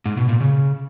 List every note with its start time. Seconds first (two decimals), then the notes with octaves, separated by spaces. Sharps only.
0.06 G#2
0.17 B2
0.29 A#2
0.41 C#3